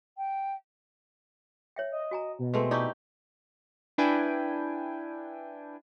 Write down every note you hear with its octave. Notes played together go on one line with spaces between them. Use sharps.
G5
C#5 E5 G5
D#5
F#4 G#5 A#5
B2
G#3 A3 C4 B4
D#4 E4 G4 D5 A5 C#6
D4 E4 B4 G5 G#5